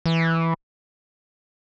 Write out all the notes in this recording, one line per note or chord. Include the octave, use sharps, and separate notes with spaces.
E3